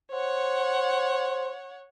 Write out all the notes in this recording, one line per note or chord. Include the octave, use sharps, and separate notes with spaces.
C5 C#5 F#5